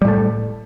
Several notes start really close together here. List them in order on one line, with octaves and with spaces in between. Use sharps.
G3 A2 A3